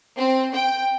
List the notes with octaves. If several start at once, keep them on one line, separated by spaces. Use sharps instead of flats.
C4
G5